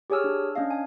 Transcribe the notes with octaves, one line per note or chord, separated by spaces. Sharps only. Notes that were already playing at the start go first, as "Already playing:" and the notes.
G4 G#4 C#5 G#5 E6 F6
D4
C#4 D4 D#5 F5
G#5